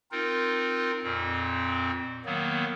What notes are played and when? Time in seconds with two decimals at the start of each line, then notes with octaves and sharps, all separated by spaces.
0.11 C4 D#4 F4 A#4
1.03 F2 A#2 C4
2.25 D#3 F#3 A#3 B3